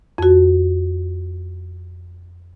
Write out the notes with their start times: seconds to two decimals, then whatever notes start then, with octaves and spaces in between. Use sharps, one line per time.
0.18 F2 F#4